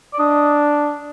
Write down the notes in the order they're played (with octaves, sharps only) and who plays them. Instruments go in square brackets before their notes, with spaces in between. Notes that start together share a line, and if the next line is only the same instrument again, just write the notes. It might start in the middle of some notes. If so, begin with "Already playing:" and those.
[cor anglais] D5
[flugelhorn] D4 [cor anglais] D#5